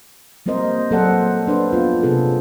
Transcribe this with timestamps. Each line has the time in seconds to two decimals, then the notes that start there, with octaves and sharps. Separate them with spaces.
0.46 G3 A#3 C4 A#4 C5 D#5
0.91 F#3 A#3 A4 C5 D5 F#5
1.47 D4 B4 C5 D5
1.73 B3 F4
2.03 C3 B3 C#4 G#4 A4